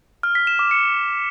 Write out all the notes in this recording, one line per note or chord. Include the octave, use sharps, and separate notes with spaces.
F6
B6
E7
D6
C#7